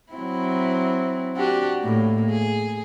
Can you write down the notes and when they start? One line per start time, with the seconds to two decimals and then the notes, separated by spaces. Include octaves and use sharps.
0.13 F#3 C4 E4
1.36 D4 F#4 G4
1.81 A2 A#3
2.31 G#4